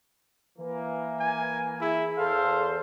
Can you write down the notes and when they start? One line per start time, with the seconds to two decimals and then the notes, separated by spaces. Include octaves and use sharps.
0.58 E3 A#3
1.20 G#5
1.81 E4 G#4
2.18 E2 A4 C5 F5